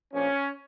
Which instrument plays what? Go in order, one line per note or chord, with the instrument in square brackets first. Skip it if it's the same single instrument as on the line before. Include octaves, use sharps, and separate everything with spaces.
[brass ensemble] A#1 A#2 F3 A#3 C#4